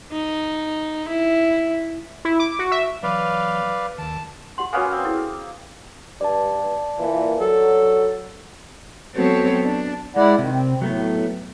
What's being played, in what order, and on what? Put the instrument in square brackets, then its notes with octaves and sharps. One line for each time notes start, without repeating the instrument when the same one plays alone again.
[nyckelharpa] D#4
E4
[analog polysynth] E4
D6
F#4
E5
[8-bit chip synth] E3 F#3 [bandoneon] B4 D5 F5
[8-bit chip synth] D#2 D#3 [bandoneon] A5
[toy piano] G4 F#5 C6
[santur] A#3 B3 C#4 [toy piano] F#4 B4 G#5
[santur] C4
[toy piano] E4 G#4 A4
[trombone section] G2 [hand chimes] D5 A5
[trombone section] A#2 E3
[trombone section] F#3 [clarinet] A4
[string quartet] F#3 B3 C4 F#4 A4 C#5
D4
[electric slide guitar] G#3 [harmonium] E4 D5 F#5
[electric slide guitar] C3 [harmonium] D#3
[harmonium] C4
[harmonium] A2 [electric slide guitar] F#3 A3 B3